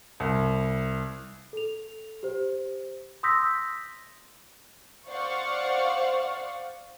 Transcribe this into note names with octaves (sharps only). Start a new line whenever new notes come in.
C2
A4 F7
G4 C5
C6 D#6 E6 G6 A#6 B6
C5 D5 F5 F#5 C#6